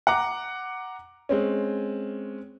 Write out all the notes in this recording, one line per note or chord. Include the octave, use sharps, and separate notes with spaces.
F#5 A#5 D6
G#3 C4 C#4